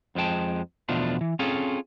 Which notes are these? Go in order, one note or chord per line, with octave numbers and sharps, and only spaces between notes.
F2 F3 G#3 G5 A5
E2 B2 F3 A3 D4 F4
E3
C4 C#4 F4 G#4 A4